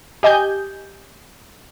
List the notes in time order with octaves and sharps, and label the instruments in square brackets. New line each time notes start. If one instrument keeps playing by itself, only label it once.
[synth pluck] G4 D#5 G#5 G6